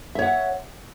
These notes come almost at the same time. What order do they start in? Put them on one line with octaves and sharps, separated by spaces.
E5 C#5 F#5